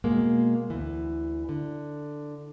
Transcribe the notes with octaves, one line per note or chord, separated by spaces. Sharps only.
B2 G#3 A#3
D2 E3
D3